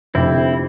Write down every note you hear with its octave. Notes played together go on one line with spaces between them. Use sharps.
F1 F2 D3 C4 E4